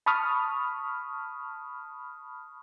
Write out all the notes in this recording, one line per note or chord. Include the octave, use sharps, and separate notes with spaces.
A5 B5 C#6 D#6 F6